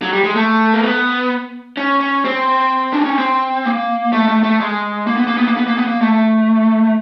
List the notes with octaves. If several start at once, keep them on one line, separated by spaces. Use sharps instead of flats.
F#3
G3
G#3
A3
A#3
B3
C#4
C#4
C4
D4
C#4
C4
A#3
A3
A3
A3
G#3
A#3
B3
A#3
B3
A#3
B3
A#3
B3
A#3
A3